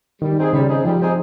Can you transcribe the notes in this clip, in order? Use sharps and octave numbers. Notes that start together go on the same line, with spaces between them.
D#3 G3
C4 D#4 G#4
C#3 G3
C4 D#4 G#4
F3 G3
C4 D#4 G#4